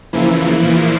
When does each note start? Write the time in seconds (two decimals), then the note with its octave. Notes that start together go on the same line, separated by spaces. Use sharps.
0.13 E2 C#3 E3 F3 A#3 E4
0.62 A#2 F3 A#3